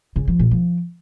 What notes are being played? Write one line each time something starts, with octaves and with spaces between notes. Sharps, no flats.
C#3
F3
A#2
F3